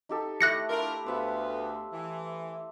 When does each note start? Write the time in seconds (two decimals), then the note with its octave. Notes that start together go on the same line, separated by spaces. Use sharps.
0.09 D#4 G4 A4
0.41 A3 E4 G4 F#6 A#6 C#7
0.70 D4 E4 F4 A#4
1.06 D2 B3 C5 E5 F5
1.93 E3